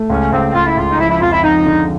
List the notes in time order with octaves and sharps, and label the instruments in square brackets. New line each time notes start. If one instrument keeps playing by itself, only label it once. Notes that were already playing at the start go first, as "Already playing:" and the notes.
Already playing: [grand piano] A3
[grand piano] C#2 [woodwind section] C#4
[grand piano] C#2 [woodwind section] C4
[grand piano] C#2 [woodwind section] F4
[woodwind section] E4
[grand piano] C#2 [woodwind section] F4
[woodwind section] D#4
[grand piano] F3 [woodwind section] E4
[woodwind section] E4
[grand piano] F2 [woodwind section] F4
[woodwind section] E4
[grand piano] F2 [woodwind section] D#4
[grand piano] D3